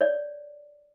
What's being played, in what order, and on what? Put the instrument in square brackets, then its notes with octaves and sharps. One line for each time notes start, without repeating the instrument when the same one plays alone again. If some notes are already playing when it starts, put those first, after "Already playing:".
[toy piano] C#5 D5